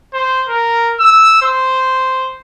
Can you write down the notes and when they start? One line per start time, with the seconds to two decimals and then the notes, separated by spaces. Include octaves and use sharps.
0.14 C5
0.49 A#4
1.00 E6
1.42 C5